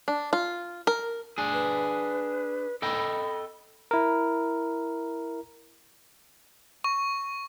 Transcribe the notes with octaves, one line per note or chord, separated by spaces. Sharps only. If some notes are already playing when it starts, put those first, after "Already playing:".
D4
F4
A#4
D4 G#4
B4
A4 D#5 G5 B5
E4 A#4
C#6